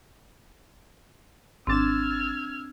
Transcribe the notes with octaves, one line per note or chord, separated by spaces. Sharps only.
G#1 C4 D4 E6 F6 G#6 A6 E7